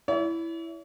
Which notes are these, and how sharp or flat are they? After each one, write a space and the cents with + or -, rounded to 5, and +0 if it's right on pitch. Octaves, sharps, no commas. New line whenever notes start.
E4 +5 C#5 +45